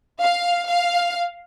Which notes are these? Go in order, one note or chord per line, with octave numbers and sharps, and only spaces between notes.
F5
F5